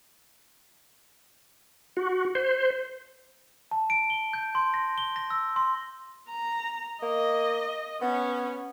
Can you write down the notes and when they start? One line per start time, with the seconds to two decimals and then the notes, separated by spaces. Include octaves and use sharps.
1.97 F#4
2.35 C5
3.71 A5
3.90 D7
4.10 G7
4.33 G6
4.55 C6
4.74 A#6
4.98 G7
5.16 A#6
5.30 E6
5.56 C6
6.30 A#5
7.02 A#3 D#5
8.01 B3 C#4